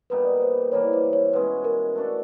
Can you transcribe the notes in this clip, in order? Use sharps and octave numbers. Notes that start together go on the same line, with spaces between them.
A#2 G3 B3 D#4 B4
C5
E3 G3 A#3 C#5
C5
C#5
B2 G#3 C#4 B4
A#4
A3 D4 F#4 A4